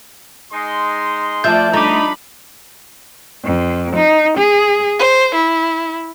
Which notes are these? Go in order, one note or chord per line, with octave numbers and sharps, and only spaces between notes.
G#3 D#4 C6
F3 A3 F4 D5 E5 A5 G6
A3 D4 D#4 A#5 B5 D6
F2
D#4
G#4
C5
E4